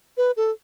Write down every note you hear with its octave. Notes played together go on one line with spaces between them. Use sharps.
B4
A4